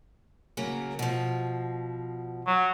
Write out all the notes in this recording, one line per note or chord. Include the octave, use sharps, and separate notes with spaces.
C#3 F#3 A#3
B2 F3
F#3